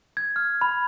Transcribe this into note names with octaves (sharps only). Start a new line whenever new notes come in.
G#6
F6
B5